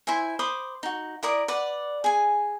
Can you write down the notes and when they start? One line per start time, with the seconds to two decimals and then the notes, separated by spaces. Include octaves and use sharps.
0.07 E4 C5 E5 G#5
0.39 C5 B5 D6 D#6
0.83 D#4 F#4
1.23 E4 A#4 D5 D#6
1.48 B4 D5 F#5
2.04 G#4 G#5